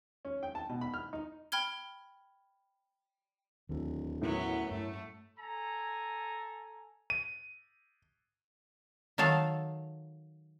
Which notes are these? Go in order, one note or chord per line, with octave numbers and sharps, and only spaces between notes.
C#4
G5
A5
B2
B5
F6
D#4
G5 B5 F6 G#6 G7
D1 D#2 D3
F#2 A2 F#3 B3
G2 A3
A4 G#5 A#5
D#7
D#3 F#3 A4 F5 A5